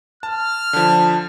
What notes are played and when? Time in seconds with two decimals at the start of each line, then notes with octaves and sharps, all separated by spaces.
0.23 A5 F6
0.73 D3 F3 A5